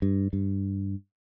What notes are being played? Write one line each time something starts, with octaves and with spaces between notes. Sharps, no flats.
G2
G2